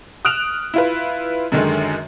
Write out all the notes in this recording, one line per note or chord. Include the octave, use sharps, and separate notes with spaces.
D#6 F6 F#6 D7 E7 F7
E4 F4 B4
F#2 D3 D#3 G#3